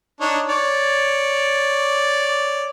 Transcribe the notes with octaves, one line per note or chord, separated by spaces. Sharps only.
D4 D#4 C#5
C#5 D5